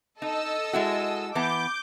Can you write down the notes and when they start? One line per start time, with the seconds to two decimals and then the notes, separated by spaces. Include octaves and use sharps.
0.22 D#4 A4 D#5 E6
0.73 G#3 E4 F#4
1.35 E3 B3 A5 D6 G6